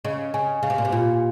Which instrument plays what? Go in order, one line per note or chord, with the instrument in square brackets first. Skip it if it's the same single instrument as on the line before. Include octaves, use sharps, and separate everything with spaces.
[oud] C#3 [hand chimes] D#5
[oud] C#3 [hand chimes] G#5
[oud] C#3 [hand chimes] F5
[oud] C3
A#2
C3
[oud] A#2 [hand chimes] F4